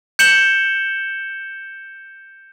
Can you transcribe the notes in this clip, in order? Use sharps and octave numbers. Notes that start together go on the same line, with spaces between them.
G6 C#7 E7 F#7 G7